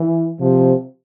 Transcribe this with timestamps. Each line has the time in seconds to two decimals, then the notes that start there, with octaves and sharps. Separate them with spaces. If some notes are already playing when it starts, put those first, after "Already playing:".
Already playing: E3
0.40 C3 F3